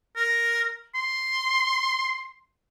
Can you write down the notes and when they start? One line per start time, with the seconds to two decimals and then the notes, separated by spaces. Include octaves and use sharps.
0.16 A#4
0.95 C6